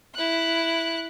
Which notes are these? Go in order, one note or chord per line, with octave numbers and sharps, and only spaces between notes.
E4 F#6